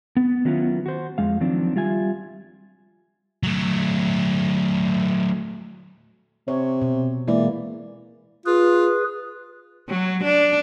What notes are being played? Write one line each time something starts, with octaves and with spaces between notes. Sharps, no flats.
B3
D#3 F#3 B3 C#4 E4 F4
F#4 C5
F2 G#3 F5
D#3 F3 F#3 C4 D4
G3 F4 E5 G#5
F#3 A3
C3 C#5
B2
E3 G#3 A#3 D5
F4 G#4 B4
F#3
D4